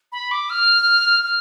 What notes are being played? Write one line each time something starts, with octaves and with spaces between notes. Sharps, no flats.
B5
D6
F6
F6